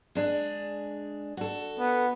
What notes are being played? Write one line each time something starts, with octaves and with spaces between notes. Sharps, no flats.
G#3 D4 G#4
F#4 A4
B3